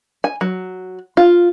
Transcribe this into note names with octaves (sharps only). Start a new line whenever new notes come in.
G#5
F#3
F4